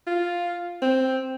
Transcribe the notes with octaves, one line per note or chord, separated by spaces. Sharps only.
F4
C4